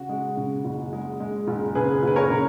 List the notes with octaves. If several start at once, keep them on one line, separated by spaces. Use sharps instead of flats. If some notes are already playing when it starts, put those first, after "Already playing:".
Already playing: C#3 F#4
G#3
C#3
F#1
G#3
G#3
F#1
C#3 G#4 B4
F#1 B4
A#4 C#5
C#3